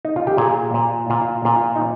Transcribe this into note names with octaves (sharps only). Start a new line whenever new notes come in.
D#4
F4
G4
A#2 G#4
A#2
A#2 F4
A#2 F4
D#4